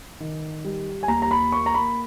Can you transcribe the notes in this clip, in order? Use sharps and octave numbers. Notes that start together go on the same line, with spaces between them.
D#3
G3
G#5
D#2 A#5
A#5
B5
A#3 C#6
A#5
B5